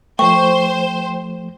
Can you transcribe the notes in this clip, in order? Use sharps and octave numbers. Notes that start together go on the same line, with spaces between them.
F3 A3 C5 G5 C#6